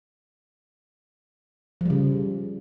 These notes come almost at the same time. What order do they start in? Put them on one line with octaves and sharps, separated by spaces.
F3 G3 C#3